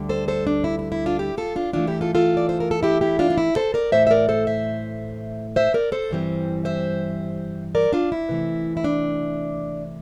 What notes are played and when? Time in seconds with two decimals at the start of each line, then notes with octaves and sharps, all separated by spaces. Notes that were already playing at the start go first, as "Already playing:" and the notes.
Already playing: D2 D3 G3 D4
0.09 A4 C5
0.28 A4 C5
0.47 D4
0.64 E4
0.79 E4
0.92 E4
1.06 D4 F4
1.19 E4 G4
1.38 F4 A4
1.56 D4 F4
1.73 G2 E3 A3 D4 F4
1.87 E4 G4
2.01 F4 A4
2.15 F4 A4
2.37 D5
2.49 C5
2.60 A#4
2.71 A4
2.83 E4 G4
3.01 E4 G4
3.19 D4 F4
3.30 D4
3.38 E4
3.56 A4 C5
3.74 A#4 D5
3.92 A2 E3 A3 C5 E5
4.07 E5
4.11 A#4 D5
4.29 A4 C5
4.47 C5 E5
5.56 C5 E5
5.74 A#4 D5
5.92 A4 C5
6.11 G2 E3 G3 C4
6.65 C5 E5
7.75 A#4 D5
7.93 D4 F4
8.12 E4
8.29 C3 E3 A3
8.77 E4
8.84 D4